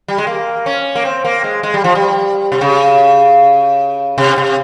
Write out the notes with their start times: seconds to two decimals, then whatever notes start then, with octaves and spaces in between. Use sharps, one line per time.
0.08 G3
0.18 G#3
0.27 A#3
0.66 C#4
0.95 A#3
1.05 C4
1.25 A#3
1.44 G#3
1.63 G#3
1.74 G3
1.84 F3
1.95 G3
2.52 C3
2.61 C#3
4.18 C3
4.38 C3